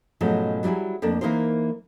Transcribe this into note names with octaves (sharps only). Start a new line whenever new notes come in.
G#2 B2 F3 F#3 A3 C#4
F#3 G3 D#4 E4 G#4
F2 A3 A#3 D4
E3 A#3 D#4 A#4 C5